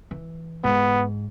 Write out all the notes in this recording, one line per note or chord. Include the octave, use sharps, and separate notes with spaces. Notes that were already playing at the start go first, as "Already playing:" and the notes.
E3
G#2 B3